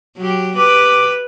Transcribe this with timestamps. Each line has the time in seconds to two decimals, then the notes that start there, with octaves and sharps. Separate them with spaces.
0.17 F#3 G4
0.56 G4 B4 D6